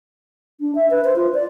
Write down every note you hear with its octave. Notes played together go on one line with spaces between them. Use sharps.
D4
E5
B4
C5
F4
D5